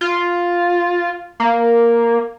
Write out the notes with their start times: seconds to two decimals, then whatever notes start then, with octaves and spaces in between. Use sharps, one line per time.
0.01 F4
1.40 A#3